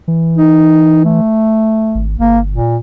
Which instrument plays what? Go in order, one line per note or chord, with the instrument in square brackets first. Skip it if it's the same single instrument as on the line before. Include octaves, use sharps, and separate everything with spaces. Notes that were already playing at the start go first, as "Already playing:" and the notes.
[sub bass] E3
[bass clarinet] D#4
A3
[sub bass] G#1
[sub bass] G1 [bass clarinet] A#3
[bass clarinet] A#2